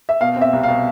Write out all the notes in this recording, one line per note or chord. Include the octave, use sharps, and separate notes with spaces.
E5
B2 F5
C4
E5
C2
F5
B2